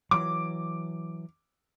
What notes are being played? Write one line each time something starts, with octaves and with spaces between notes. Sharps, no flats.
E3 F#3 D6